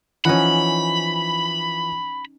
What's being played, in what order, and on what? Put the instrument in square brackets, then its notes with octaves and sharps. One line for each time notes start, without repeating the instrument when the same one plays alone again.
[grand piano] E3 F3 [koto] C#4 D#4 F#5 [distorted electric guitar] B5